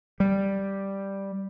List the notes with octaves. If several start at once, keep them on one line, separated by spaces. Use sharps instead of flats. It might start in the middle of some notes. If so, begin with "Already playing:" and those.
G3